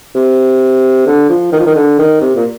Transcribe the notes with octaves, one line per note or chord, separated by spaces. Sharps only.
C3
D3
F3
D#3
F3
D#3
D3
D#3
C3
A#2